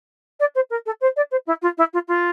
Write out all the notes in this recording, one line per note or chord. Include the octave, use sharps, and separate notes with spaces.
D5
C5
A#4
A4
C5
D5
C5
E4
F4
E4
F4
F4